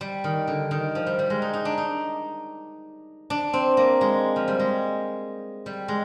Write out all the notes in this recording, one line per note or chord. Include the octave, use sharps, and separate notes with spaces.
G3
D#3
D3
D#3
F3
G3
G3
G#3
D#4
D#4
D4
D#4
D4
C4
A#3
G#3
F3
G3
G#3
G3
G#3